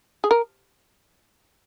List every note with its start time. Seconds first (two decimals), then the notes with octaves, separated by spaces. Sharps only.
0.24 G#4
0.31 A#4